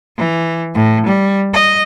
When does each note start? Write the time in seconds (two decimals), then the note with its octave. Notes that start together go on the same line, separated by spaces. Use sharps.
0.17 E3
0.75 A2
1.06 G3
1.54 D#5